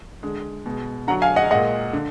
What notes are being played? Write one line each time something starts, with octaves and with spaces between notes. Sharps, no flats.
D3 G#3
B2 G#3
D3 F#3 F#5 A#5
F5 G#5
D#5 F#5
A#2 G#3 D#5 F#5
D3